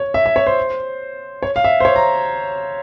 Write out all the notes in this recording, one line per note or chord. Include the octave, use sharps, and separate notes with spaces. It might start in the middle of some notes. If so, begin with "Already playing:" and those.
Already playing: C#5
E5
E5
C#5
C5
C#5
F5
E5
C5
C#5
A#5